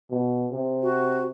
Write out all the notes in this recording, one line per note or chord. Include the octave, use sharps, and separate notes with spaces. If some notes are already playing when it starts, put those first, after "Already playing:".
B2
C3
F#4